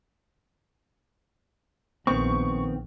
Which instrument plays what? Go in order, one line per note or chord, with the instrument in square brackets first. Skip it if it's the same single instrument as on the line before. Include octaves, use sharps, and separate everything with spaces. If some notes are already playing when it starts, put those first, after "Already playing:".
[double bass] A#1 [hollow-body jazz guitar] D#3 B3 C4 [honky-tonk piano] C#6